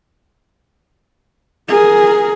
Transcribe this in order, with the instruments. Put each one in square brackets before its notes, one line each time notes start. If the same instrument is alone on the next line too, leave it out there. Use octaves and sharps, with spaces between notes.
[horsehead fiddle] G#4 A#4